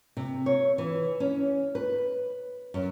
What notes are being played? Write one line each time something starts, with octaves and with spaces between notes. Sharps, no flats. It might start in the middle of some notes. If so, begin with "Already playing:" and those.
C3
C#5
E3
C#4
B4
F#2